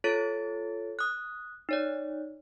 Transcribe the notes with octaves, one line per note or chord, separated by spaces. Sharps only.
F4 A4 C#5 A6 D7
D#6 F#6
D#4 C#5 D5